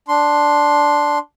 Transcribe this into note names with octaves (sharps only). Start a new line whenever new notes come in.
D4 C6